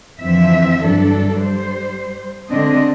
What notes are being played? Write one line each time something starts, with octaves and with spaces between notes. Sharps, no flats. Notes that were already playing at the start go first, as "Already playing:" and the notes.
F2 D3 E3 F3 C4 E5
G2 F#3 D4 A4
G3 C5
D3 G#3 C4 D4 D#5